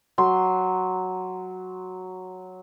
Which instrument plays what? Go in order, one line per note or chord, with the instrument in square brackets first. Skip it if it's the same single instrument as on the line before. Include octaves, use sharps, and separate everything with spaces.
[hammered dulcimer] F#3 C6